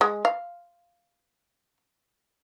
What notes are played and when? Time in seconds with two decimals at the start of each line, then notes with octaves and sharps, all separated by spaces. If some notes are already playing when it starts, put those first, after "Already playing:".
0.01 G#3
0.25 F5